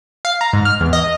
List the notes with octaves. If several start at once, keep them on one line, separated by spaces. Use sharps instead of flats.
F5
A#5
G#2
F6
E2
D#5